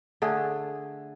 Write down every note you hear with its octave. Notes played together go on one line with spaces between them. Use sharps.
D3 A3 G#4